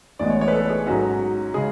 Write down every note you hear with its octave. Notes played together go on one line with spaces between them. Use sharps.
A1 A2 G#3 B3 D5
C#5
C#5
B4
A4
G#4
G#2 F#3 C#4 F#4
C#3 G#3 G#4